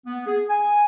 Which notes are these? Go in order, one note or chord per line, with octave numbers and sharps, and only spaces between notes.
B3
G#4
G#5